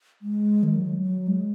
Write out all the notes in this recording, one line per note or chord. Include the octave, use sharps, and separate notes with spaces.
G#3
D#3
F#3
F#3
G#3